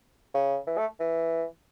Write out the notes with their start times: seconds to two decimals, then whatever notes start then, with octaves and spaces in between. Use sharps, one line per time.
0.34 C#3
0.67 E3
0.78 A3
1.00 E3